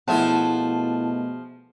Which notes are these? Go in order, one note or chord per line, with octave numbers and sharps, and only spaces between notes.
B2 F3 A3 E4 F4 G#4 F#5 A5